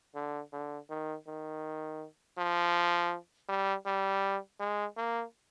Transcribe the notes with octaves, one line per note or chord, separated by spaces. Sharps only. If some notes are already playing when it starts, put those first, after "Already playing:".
D3
D3
D#3
D#3
F3
G3
G3
G#3
A#3